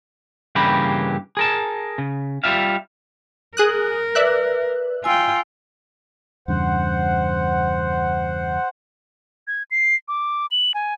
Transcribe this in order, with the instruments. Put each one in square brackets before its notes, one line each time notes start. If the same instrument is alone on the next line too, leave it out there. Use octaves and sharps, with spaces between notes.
[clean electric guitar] G2 C#3 E3 A#3 G4 B5
G#4 A#4 A5
C#3
G3 F4 E5 F5
[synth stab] G#4 D#6 F#6 [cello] A#4
[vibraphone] B4 [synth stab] D5 E5 F#6
[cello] F4 G5 [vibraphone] G#5 E6
[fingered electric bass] E2 G2 C#3 [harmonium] C5 F#5
[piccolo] G#6
C7
D6
F#7
G#5